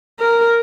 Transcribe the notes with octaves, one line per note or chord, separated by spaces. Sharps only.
A#4